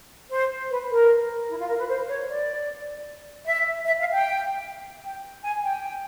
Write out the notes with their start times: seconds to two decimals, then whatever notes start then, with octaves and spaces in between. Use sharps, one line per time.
0.31 C5
0.70 B4
0.90 A#4
1.49 E4
1.59 F4
1.69 A#4
1.79 B4
1.88 C5
2.08 C#5
2.28 D5
3.46 E5
3.86 E5
3.99 F5
4.12 G5
5.04 G5
5.44 G#5
5.63 G5